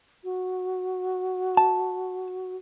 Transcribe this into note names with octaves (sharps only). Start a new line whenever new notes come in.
F#4
A5